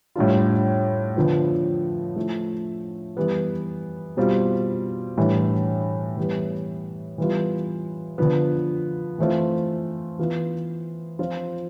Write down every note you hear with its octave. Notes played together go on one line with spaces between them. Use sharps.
A2 G3 D4 F4
D3 F3 B3
F3 A3 E4
E3 G3 B3
B2 G3 C4 F4
A2 E3 G3 D4
E3 G3 B3
E3 G3 B3 F4
D3 F3 B3
E3 A3 C4 F4
E3 B3 F4
F3 C4 F4